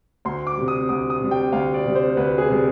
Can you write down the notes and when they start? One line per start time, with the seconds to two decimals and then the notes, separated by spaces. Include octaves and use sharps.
0.25 D2 C6
0.47 D6
0.57 C3 G3
0.68 D#6
0.89 D2 D#6
1.10 D#6
1.21 C3 G3
1.31 G5
1.53 D2 F5
1.74 D5
1.85 C3 G3
1.95 C5
2.17 D2 B4
2.38 G#4
2.48 C3 G3